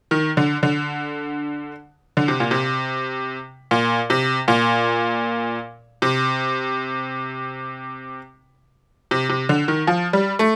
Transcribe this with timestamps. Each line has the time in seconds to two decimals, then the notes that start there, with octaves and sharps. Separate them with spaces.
0.11 D#3
0.37 D3
0.63 D3
2.17 D3
2.28 C3
2.40 A#2
2.51 C3
3.71 A#2
4.10 C3
4.48 A#2
6.02 C3
9.11 C3
9.29 C3
9.49 D3
9.68 D#3
9.87 F3
10.13 G3
10.39 A3